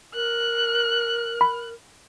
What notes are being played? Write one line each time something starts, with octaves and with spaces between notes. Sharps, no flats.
A#4 F#6
B5